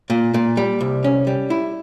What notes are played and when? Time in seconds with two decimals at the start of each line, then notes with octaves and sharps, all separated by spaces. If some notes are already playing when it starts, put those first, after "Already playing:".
0.10 A#2
0.34 A#2
0.57 G3
0.80 C2
1.04 C#4
1.27 G3
1.50 E4